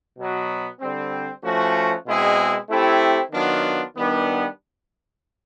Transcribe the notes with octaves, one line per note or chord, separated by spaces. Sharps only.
B2 F#3 B3
D3 G3 C4
F3 A3 C#4 F#4
B2 G#3 C4 E4 G#4
A3 C4 E4 G4
D#3 F#3 B3 D4 F4
D#3 G3 B3 D4